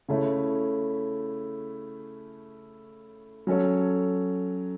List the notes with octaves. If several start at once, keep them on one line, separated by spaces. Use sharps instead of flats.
C#3 A3 E4 C#5
F#3 C#4 A4 C#5